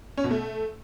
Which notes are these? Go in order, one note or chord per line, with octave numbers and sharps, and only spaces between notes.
C#4
B2
A3